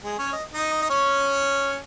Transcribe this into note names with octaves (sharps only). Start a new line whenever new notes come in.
G#3 G#4
C#4 C#5
D#5
D#4 D#5
D#5
C#4 C#5